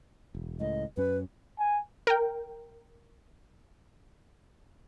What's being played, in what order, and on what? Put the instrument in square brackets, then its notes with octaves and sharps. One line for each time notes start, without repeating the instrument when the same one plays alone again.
[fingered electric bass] E1
[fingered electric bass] C#2 A2 [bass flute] D#5
[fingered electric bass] F#2 C#4 [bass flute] B4
[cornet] G#5
[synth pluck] A#4 G5